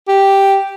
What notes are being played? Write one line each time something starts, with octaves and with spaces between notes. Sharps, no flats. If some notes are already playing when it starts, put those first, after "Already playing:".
G4